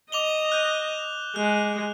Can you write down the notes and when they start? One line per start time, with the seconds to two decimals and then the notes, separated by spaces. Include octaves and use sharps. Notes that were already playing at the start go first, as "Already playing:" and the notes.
0.12 D#5 D6 F7 G7
0.52 F#6 G6
1.36 G#3 F#6